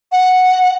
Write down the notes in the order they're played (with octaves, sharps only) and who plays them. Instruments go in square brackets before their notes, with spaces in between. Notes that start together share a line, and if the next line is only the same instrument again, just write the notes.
[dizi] F#5